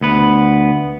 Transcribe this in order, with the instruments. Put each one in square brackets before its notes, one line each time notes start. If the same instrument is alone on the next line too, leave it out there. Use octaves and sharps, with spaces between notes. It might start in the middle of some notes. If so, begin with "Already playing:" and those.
[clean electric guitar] D2 B3 B4